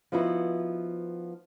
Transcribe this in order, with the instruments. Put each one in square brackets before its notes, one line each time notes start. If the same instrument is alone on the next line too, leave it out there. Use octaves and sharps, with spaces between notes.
[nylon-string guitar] F3 B3 D#4 E4 F#4